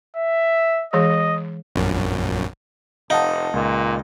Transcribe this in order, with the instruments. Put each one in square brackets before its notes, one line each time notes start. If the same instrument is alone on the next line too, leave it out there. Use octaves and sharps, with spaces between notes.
[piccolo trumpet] E5
[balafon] E3 G#3 G#4 [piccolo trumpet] D#5
[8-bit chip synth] A#1 F#2
[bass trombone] F1 [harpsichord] D#4 [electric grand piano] F5 F#5 A5
[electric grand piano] C#2 [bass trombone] A#2